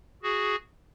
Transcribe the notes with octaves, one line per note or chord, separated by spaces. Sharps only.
F#4 G#4